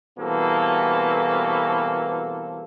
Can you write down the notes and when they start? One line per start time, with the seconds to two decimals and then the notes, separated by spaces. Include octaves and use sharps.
0.18 G2 B2 E3 A#3 C4 A4